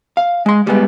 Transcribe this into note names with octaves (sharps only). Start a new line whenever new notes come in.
F5
G#3 C6
G3 G#3 B3